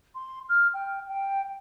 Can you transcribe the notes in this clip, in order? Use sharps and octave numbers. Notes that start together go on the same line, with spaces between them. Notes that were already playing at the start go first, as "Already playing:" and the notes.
C6
F6
G5
G5